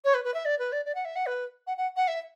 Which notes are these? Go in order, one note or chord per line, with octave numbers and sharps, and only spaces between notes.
C#5
B4
B4
E5
D5
B4
D5
D5
F#5
E5
F#5
B4
F#5
F#5
F#5
E5